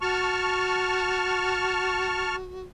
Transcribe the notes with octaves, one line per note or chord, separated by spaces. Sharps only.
F#4 A5 C#6 F6